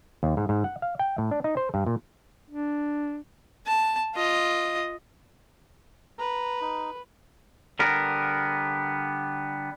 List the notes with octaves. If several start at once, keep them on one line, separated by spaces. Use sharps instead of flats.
D#2
G#2
G#2
F#5
F5
G5
A2
D4
D#4
C5
G2
A#2
D4
A5
F4 D#5
B4 A#5
D#4
D3 G3 B3 A#4